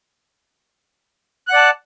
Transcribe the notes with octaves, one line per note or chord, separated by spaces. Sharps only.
D5 F#5 A5 F#6